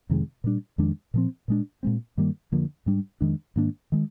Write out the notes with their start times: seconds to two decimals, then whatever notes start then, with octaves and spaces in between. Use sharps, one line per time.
0.09 F2 C3 D#3 G#3
0.44 A#2 G3 D4
0.78 F2 D#3 G#3 D4
1.14 A#2 F3 C4
1.48 A#2 G#3 D4
1.83 A#2 G#3 C4
2.17 G2 D#3 G3 A#3
2.52 F2 D3 F3 A#3
2.86 G#2 G3 D4
3.21 F2 D#3 G#3 D4
3.56 G#2 D#3 A#3 D4
3.92 D#3 G#3